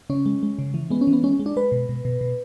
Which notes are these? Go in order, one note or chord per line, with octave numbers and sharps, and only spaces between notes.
C#3 C#4
G#3
G#3
C#3
E3
G#3 B3
C#4
E3
B3
G#3 C#4
G#3
D4
G#3 B4
B2
B2
B2
B2